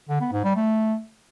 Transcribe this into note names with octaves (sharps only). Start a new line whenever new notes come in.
D3
B3
G#2
G3
A3